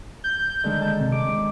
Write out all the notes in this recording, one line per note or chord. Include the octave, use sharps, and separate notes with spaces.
G6
D3 D#3 G#3
A5
C3
G#3 D6